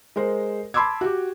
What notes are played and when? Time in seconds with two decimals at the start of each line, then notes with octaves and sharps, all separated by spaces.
0.16 G#3 A#4 C5
0.74 A5 B5 C6 D6 E6 G#6
1.01 F#4 G4